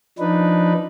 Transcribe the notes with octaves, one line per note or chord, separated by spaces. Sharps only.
F3 D4 D#4 B4